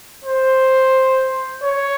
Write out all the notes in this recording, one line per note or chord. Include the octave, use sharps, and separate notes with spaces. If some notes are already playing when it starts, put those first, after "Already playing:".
C5
C#5